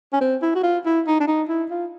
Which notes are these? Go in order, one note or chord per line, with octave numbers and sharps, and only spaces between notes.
C#4
C4
E4
F#4
F4
E4
D#4
D4
D#4
E4
F4